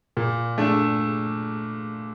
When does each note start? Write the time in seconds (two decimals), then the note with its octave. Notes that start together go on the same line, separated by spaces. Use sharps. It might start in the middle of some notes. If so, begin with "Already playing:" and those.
0.17 A#2
0.58 A3 D4